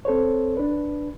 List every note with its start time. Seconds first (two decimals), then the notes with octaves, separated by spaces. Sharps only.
0.05 C4 A4 C5 C#5
0.57 D4 B4